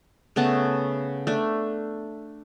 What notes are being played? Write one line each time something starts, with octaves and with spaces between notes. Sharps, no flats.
C#3 A3 B3 A5
A3 D4